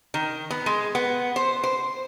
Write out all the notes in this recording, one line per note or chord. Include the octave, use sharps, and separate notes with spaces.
D#3
B3
G#3
B3
C5
C5